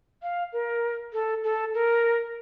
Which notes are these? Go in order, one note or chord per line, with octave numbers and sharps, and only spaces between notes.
F5
A#4
A4
A4
A#4